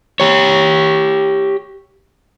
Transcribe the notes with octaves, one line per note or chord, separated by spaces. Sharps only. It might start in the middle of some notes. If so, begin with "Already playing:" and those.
G4 C#5